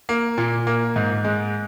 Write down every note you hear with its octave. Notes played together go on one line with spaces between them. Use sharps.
A#3
A#2
A#3
G#2
G#3